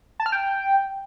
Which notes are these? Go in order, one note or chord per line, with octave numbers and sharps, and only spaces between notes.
A5
F6
G5